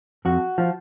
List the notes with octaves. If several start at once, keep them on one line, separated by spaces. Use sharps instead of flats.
F2 F#4
F3